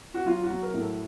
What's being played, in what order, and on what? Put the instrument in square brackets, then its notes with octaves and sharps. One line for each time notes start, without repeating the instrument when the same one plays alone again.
[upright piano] F#4
F#3 F4
F#4
F#3
A#4
A2
A4